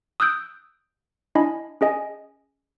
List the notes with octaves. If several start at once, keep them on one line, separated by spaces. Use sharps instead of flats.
D#6 E6 F#6 G6 D7
D4 E4 D#5 G#5 B5
C#4 G#4 D#5 G#5